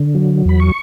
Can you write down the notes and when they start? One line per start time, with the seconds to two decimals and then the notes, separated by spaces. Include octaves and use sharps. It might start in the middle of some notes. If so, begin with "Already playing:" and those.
Already playing: D3
0.15 F#3
0.45 E2 B5
0.60 C#6